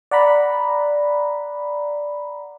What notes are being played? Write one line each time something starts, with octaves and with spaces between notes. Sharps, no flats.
D5 F#5 A#5 B5